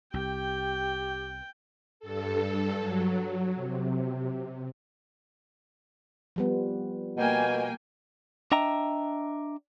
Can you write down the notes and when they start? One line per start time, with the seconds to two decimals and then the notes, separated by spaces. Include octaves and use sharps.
0.14 C2 G4 G5
2.00 G2 A4
2.79 F#3
3.55 C3
6.36 F3 G3 B3
7.17 B2 A#3 G5 G#5
8.52 D4 D#5 E5 G5 A#5